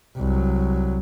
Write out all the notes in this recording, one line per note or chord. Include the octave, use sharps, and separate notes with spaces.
C2 F#3